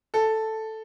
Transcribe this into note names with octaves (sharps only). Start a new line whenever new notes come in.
A4